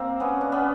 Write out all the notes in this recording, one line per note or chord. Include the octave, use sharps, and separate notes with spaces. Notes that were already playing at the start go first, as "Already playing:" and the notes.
Already playing: A#3 C4
B3 C#4
D4
B3 C#4